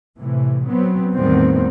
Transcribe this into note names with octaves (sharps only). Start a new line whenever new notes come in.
A2 C3 E3
F#3 B3 C4
E2 A2 D#3 G3 B3 C4